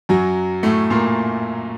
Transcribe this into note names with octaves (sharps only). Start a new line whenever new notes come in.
F#2 F#3
A2 A3
A#2 A#3